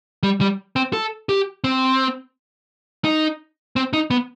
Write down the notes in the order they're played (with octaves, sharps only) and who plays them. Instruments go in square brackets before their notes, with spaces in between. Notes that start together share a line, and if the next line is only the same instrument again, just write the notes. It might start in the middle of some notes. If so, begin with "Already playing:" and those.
[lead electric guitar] G3
G3
C4
A4
G4
C4
D#4
C4
D#4
B3